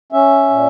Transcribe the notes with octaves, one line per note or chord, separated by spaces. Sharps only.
C#4 E5
A#2